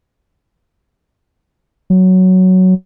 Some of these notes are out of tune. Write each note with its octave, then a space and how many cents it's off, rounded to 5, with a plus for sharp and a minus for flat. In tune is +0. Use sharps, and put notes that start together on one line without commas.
F#3 +5